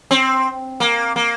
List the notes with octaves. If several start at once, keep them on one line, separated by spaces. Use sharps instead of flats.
C4
A#3
A#3